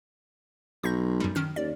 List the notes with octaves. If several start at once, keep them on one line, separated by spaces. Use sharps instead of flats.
B1 C#6 G6 A#6
F#2 G3
D#3 C#4 F6
D#2 D5